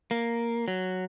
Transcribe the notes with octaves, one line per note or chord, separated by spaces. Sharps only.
A#3
F#3